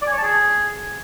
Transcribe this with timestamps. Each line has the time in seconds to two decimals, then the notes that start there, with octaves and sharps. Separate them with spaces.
0.02 D5
0.07 G#5
0.12 C#5
0.18 A5
0.23 G#4